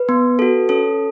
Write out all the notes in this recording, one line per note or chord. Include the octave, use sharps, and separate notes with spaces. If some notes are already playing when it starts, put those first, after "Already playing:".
Already playing: B4
B3
F#4 A4
C#4 A4